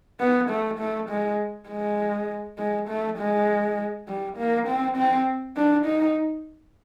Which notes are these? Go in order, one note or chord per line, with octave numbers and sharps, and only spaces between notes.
B3
A3
A3
G#3
G#3
G#3
A3
G#3
G3
A#3
C4
C4
D4
D#4